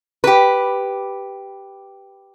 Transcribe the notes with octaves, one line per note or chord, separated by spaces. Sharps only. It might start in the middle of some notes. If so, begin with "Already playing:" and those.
G4 B4